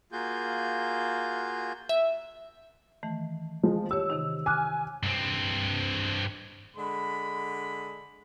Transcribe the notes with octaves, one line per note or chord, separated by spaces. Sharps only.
A#3 F4 F#4 G#4 G6
E5
D#3 E3 A3
F3 G#3
G4 C#5 E6
C3 D#3 D#4
G#5 D6 F6 F#6
G2 C4
D3 G#3 B5